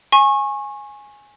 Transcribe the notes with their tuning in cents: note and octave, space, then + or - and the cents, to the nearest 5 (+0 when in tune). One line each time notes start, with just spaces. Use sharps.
G#5 +0 C#6 -30